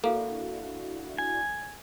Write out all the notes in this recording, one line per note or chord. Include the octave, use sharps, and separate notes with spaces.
A#3 D4 E4 F#4 A4 F5
G#5